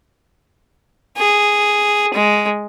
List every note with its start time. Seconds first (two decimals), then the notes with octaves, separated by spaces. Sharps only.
1.17 G#4
2.15 G#3